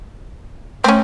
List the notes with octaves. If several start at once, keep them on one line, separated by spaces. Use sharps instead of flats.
A3 C4 C#4